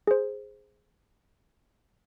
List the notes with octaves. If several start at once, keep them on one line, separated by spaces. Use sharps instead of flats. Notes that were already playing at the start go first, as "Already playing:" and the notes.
G#4 C5